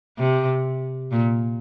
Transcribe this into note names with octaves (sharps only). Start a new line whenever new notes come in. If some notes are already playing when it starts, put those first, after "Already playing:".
C3
A#2